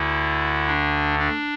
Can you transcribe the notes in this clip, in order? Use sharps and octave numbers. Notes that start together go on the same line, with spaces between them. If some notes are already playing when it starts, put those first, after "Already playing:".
Already playing: D2 D3 E4
D4
D4